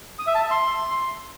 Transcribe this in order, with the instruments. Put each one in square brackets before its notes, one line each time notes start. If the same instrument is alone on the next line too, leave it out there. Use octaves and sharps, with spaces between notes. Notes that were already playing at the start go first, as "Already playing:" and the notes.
[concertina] D#6
E5
A5
E5
C6